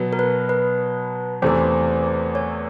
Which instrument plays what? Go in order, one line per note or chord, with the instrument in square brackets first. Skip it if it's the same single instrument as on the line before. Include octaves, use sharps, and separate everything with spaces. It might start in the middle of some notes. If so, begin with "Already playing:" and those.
Already playing: [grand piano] B2 F#3 B3
[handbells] A#4
B4
B4
[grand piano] E2 C3 E3 A3 [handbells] C5
[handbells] C#5